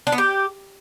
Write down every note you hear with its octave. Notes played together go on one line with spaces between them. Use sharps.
D4
B3
G4